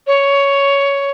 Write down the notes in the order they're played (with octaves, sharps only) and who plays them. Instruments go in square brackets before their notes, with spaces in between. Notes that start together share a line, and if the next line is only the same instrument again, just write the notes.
[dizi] C#5